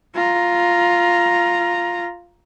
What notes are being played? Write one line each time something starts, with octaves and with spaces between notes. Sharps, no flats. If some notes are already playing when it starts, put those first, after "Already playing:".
F4 A#5